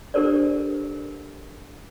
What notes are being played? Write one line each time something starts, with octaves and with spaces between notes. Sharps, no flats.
D4 G4 A4 A#4 C5 D5